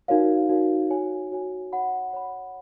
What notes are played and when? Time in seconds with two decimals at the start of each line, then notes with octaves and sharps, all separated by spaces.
0.08 D#4 F#4 A#4 C#5 F5
0.49 D#4 F#4 A#4 C#5 F5
0.90 F#4 C#5 G#5
1.32 F#4 C#5 G#5
1.72 C#5 F#5 B5
2.13 C#5 F#5 B5